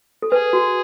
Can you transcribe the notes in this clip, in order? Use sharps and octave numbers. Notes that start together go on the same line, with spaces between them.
A4
G#4 B4
F#4